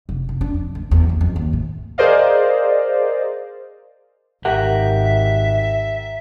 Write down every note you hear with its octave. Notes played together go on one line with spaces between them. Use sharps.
F1
F1
D4
F2
D2
E2
D#2
F2
D#2
A2
G#4 A#4 C5 D5 D#5 F5
G#1 G4 A#4 E5 F#5